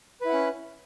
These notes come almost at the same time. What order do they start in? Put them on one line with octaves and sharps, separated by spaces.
B4 E4 F#5 C#4